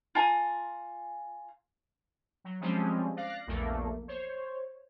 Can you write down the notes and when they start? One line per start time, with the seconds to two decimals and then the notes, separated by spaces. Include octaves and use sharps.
0.15 F4 G#5 A#5
2.44 F#3
2.61 F3 G3 G#3 C4 C#4
3.16 D5 F5 F#6 A#6
3.47 A#1 E2 A3 A#3
4.08 C5 C#5